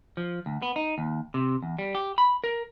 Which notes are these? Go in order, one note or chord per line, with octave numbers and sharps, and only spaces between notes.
F3
D2
B3
D#4
D#2
C3
E2
G3
G4
B5
A#4